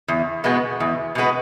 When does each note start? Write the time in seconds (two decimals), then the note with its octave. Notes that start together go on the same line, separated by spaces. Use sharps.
0.08 E2
0.44 B2 G#3 B3
0.80 E2
1.15 B2 G#3 B3